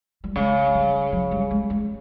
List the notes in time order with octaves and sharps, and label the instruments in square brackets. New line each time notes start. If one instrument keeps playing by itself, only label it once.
[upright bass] G3
[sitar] C#3 [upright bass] G#3
[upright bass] G3
F#3
G3
G#3
G#3